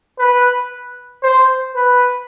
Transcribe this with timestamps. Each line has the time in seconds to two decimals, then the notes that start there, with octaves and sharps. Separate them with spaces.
0.19 B4
1.23 C5
1.75 B4